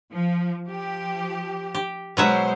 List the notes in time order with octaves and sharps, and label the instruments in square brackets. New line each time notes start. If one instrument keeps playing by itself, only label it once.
[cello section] F3
F3 G4
[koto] G4
[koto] B2 F#3 E5 [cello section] G#3 C5 C#5